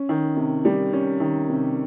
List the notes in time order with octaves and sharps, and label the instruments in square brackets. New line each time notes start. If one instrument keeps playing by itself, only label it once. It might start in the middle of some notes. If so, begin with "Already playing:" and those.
Already playing: [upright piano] C#4
D#3
C3
G3
C#4
D#3
C3